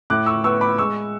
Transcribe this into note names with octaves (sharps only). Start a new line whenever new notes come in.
A2 D6 F#6
C#6 E6
B3 C#6 E6
B5 D6
G#3 C#6 E6